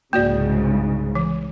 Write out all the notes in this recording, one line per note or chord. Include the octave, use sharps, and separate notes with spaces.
C2 G#2 C#3 A#3 F#4 D5
E3